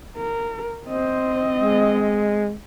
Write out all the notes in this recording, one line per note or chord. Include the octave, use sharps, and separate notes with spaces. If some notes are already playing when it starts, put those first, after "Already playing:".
A#4
C4 C5 D#5
G#3